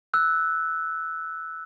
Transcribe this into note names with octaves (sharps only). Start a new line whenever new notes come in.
E6 F#6